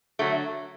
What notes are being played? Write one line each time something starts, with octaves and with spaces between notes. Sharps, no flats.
D3 F#3 A3